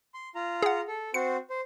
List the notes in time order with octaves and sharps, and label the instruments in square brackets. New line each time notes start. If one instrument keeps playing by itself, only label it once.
[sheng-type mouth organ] C6
F4 A#5
[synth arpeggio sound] G#4 F#5
[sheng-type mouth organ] A4
[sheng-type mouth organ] C4 F#4 C5 [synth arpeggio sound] C#7
[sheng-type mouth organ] C5